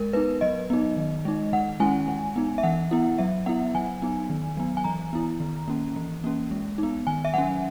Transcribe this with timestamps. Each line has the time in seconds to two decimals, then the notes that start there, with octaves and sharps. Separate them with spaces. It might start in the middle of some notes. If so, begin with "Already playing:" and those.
Already playing: G#3 A#4
0.13 B3 D#4 B4
0.41 F#3 D#5
0.70 B3 D#4
0.97 D#3
1.25 G#3 D#4
1.53 D#3 F#5
1.80 G#3 C#4 E4 G#5
2.08 G#3
2.36 B3 D#4
2.58 E5
2.63 E3 F#5
2.91 B3 E4
3.18 F#3 E5
3.46 B3 E4 F#5
3.75 F#3 G#5
4.02 B3 D#4
4.30 D#3
4.57 F#3 B3
4.77 G#5
4.84 E3 A#5
5.13 B3 E4
5.40 D#3
5.68 A#3 C#4
5.96 E3
6.24 A#3 C#4
6.51 G#3
6.78 B3 D#4
7.07 D#3 G#5
7.25 E5
7.34 F#3 C#4 F#5